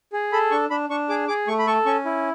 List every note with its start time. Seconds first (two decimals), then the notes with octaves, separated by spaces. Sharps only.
0.13 G#4
0.33 A4 B5
0.51 D4 C#6
0.70 D4 B5
0.90 D4 C#6
1.09 G#4 D6
1.28 G#4 D6
1.48 A3 C#6
1.59 B5
1.67 A4 C#6
1.86 C#4 C#6
2.05 E4